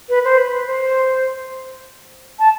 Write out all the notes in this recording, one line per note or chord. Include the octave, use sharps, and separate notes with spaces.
B4
C5
B4
C5
A5